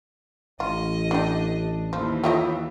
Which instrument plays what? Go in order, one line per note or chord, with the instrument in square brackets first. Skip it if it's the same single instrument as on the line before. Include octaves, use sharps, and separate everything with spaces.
[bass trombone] A1 [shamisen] F4 [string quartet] D#5
[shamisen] E3 G4 [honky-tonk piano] D4
[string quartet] D#2 E3 [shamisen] F3
[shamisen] A3 C#5 D#5 [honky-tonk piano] F4 E5 G5